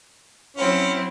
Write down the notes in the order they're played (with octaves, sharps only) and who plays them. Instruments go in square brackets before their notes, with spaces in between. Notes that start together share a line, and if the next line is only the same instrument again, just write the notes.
[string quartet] F#3 C4 E4 [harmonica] C#4